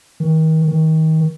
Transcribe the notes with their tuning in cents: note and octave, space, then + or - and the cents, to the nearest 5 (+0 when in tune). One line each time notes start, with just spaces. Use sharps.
D#3 +35
D#3 +30